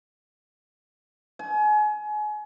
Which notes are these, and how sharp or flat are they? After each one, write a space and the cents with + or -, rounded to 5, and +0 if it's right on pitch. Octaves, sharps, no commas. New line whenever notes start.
G#5 +30